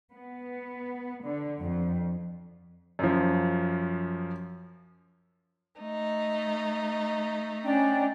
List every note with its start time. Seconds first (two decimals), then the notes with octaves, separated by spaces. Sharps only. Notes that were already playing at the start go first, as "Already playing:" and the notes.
0.14 B3
1.25 D3
1.61 F2
2.99 F#2 F3
5.80 A3 D#4
7.64 C#4 D4 G5